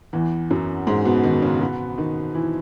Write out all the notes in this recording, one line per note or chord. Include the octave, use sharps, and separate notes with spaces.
E2 E3
F#2 F#3
G#2 G#3
B2 B3
D#3 D#4
C#3 C#4
B2 B3
D#3 D#4
E3 E4